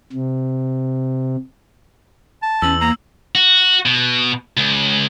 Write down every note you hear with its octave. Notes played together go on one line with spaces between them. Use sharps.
C3
A5
E2 C#4 E6 F#7
A#3 A#5
F#4
B2
C#2